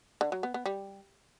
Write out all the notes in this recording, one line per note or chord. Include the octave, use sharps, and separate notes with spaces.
D3
F#3
B3
B3
G3